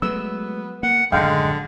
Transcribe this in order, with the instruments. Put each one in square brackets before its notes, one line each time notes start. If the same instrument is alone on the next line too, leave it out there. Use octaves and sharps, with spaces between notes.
[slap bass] F#3 G#3 A3 [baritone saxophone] B3 [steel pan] E6
[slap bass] A#3 [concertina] F#5
[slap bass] D1 F#2 D#3 [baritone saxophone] D3 [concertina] G#3 [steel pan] F5 G5